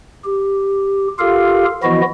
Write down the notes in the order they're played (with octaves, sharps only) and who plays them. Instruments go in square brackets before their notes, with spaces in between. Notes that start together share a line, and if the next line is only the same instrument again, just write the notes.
[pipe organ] G4
F4 G4 A4 A#4 F5
E3 F3 B3 E4 F#4 D#5